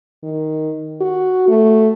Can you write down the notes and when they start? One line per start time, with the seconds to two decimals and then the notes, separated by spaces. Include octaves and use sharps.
0.23 D#3
1.01 F#4
1.48 A3